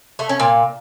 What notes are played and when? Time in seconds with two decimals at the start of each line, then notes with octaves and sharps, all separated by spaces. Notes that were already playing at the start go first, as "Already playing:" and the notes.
0.19 A3
0.29 C#4
0.40 A#2